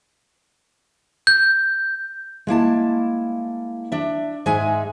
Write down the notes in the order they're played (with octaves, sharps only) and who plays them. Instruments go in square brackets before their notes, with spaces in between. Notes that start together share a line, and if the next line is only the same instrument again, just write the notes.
[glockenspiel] G6
[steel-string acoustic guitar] G#3 A#3 E4 A5
D4 E5
G#2 G#3 D#4 G#4 E5 G#5